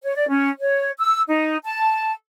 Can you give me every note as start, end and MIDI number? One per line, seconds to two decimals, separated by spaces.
0.03 0.15 73
0.16 0.28 74
0.29 0.49 61
0.60 0.90 73
0.99 1.22 88
1.28 1.57 63
1.65 2.12 81